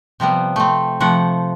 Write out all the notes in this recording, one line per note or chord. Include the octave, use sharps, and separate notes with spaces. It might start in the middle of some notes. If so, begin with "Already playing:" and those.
C3 F3 G3 B3
A3 C4
C3 F3 A3 F#5